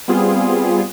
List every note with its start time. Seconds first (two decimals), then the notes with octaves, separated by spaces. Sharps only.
0.08 G3 B3 C4 F4 G#4